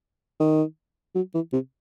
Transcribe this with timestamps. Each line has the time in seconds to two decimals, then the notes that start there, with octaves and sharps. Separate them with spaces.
0.40 D#3
1.15 F#3
1.34 E3
1.53 C3